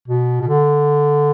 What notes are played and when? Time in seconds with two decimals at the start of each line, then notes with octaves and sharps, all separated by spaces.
0.08 B2
0.42 B2
0.47 D3